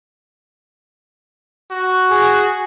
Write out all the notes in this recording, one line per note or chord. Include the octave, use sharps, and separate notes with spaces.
F#4
G#4